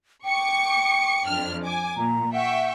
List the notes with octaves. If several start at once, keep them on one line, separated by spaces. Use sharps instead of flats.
G5 C#6 D6 C#7
F2 D4 F6
G#5 D6
A#2 A#5
E5 F#5 G5 C#6